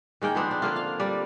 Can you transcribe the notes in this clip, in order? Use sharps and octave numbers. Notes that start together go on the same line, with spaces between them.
D#3 G#3 A#3 G5
F3 B3 C4 D4
D4
D3 A#3 F4
F5
G3 D5